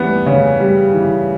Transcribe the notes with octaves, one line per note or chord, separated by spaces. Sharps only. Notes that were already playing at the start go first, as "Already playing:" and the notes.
Already playing: E3 G3 B3
C#3
G3
E3